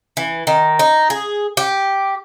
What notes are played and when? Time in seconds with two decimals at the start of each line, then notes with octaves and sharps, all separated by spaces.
0.17 E3
0.47 D#3
0.79 D#4
1.10 G#4
1.57 G4